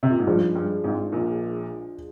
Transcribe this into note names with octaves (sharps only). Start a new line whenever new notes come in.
C3
A#2
G#2
G2 F3 G#3 D4
G2
G#1 G#2
A#1 A#2